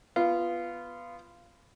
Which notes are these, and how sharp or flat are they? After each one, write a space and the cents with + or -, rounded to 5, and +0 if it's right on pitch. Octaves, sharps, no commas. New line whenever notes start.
B3 +0 F4 -15